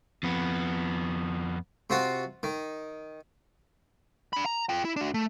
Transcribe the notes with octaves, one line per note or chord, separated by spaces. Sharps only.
F2 B3
C3 F4 F#4
D#3
D4 B5
A#5
F4 G5
E4
D4 F#4
A3